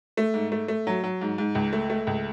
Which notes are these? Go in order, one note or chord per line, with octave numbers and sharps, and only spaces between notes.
A3
G#2
A3
A3
F#3
F#3
G#2
G#2
C#2
A3
A3
C#2